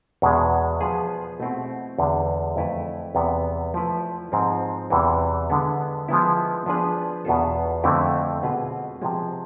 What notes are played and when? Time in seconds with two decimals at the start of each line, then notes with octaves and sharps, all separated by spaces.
0.22 E2 B2 G#3
0.81 F3 B3 F4 G#4
1.40 B2 A3 C4 E4
1.98 E2 D3 G#3
2.56 F2 E3 A3 E4 B4
3.15 E2 C3 E3 B3
3.74 F3 A3 E4 B4
4.32 G#2 F3 G#3 C4
4.90 E2 C3 E3
5.50 D3 G#3 B3
6.08 F3 G#3 B3 E4
6.66 F3 B3 D4 G#4 B4
7.25 E2 B2 B3 F4 A4
7.84 F2 D3 A3 C4 E4
8.43 B2 G#3 C4 F4 B4
9.02 C3 F3 G#3